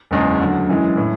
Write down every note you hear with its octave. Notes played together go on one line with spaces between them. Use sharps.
F#1 E2 C#3 G#3 C#4
D2 D3 F#3
F#2 E3 G#3
A2 E3